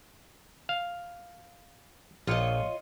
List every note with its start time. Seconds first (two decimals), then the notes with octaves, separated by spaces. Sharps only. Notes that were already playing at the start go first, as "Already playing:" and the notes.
0.69 F5
2.27 A#1 F4 C#5 D#5